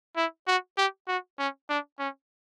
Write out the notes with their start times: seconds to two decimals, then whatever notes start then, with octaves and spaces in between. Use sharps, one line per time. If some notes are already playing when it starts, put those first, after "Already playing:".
0.16 E4
0.47 F#4
0.77 G4
1.08 F#4
1.38 C#4
1.69 D4
1.99 C#4